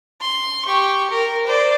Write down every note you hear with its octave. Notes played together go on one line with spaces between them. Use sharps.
C6
G4 C#6
A#4
C5 D5